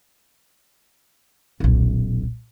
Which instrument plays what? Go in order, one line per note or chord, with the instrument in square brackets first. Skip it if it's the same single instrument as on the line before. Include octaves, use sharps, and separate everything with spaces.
[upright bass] D#1 B1